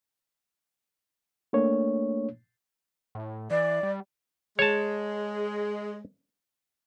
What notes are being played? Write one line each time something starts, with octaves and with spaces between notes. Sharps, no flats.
A3 A#3 D4 C#5
A2
E3 D5
G3
G#3 C#5 A5